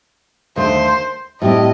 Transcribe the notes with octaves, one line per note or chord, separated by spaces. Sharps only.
D#2 D3 A3 C5
A2 G3 C4 G4 D#5